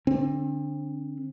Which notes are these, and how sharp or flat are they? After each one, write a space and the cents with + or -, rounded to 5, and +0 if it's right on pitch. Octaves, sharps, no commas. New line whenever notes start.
D3 +0 C4 +35